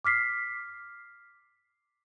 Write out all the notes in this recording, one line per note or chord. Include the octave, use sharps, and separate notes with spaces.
D6 F6 B6 C7